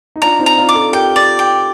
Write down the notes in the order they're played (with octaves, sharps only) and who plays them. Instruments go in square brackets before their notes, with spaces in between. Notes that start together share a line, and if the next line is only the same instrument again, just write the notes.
[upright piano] D#4
[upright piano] D4 F4 [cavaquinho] A#5
[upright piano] C4 D#4
[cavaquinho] A#5
[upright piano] D4 F4
[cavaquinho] D6
[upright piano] F4 A4
[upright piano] G4 A#4 [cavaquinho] G5
[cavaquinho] D5
G5